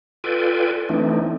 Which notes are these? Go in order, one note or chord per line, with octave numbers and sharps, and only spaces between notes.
F4 A4 B4 D5 G5 G#5
E3 A3 C4 D4 D#4